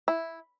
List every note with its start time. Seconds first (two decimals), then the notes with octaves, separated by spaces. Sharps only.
0.08 E4